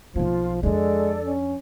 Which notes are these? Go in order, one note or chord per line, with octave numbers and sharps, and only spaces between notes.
B1 F3 A#3 F4
F2 G#3 D4 A4 D5
C#4